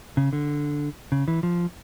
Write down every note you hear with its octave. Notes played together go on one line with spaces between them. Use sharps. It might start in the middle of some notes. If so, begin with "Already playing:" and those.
C#3
D3
C#3
E3
F3